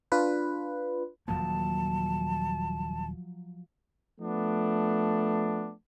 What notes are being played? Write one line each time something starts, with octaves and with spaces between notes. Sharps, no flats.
D4 F4 B4
D#1 E2 F3 F#3 A#3 A5
F3 A3 B3 D4